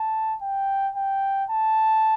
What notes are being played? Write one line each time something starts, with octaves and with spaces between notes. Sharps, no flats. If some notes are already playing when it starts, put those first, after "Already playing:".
Already playing: A5
G5
G5
A5